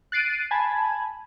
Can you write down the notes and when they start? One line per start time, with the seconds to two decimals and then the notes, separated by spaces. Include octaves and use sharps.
0.12 F#6 A6 C7 D7 D#7
0.51 G#5 A5 B5 G#6